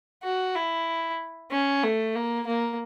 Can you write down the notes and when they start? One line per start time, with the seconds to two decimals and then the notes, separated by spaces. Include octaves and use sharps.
0.24 F#4
0.55 E4
1.51 C#4
1.83 A3
2.15 A#3
2.47 A#3